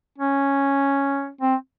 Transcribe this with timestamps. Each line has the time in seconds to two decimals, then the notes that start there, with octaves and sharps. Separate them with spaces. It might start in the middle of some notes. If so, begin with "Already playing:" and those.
0.18 C#4
1.41 C4